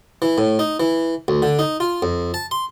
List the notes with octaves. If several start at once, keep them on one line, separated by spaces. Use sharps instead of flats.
E3
A2
D#4
E3
D2
D3
D#4
F4
F2
A5
C6